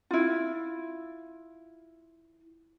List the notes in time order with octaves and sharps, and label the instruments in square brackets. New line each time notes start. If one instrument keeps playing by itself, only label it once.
[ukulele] E4 F4